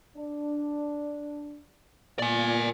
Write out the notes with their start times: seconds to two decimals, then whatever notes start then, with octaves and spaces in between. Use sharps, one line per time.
0.17 D4
2.19 A#2 D5 G#5